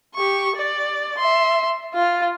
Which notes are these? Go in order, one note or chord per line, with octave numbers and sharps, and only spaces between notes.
G4 C#6
D5
E5 C6
F4